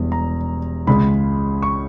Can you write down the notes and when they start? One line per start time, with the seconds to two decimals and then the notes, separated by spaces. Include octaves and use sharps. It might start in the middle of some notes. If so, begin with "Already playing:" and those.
Already playing: E1 E2 G3
0.12 A#5
0.87 C#2 C#3 G#3 B5
1.62 C#6